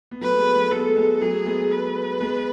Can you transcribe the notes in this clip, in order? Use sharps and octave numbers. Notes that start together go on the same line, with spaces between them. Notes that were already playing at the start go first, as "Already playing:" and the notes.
B3
F#3 A3 B4
G#3 B3
F#3 A3
G#3 B3 A4
G#3 B3
F#3 A3 G#4
G#3 B3
B4
G#3 B3